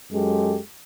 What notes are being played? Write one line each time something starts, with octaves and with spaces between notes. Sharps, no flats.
F#2 G#3 G4 A4